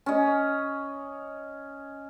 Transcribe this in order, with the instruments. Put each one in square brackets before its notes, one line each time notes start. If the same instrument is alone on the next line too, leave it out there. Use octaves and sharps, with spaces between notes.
[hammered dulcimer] C#4 D#5